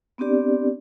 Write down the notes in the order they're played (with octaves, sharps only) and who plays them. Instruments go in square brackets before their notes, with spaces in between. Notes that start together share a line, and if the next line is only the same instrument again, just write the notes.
[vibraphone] B3 C4 D4 G4 D5